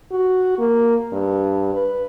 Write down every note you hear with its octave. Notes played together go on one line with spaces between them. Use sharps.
F#4
A#3
G2
B4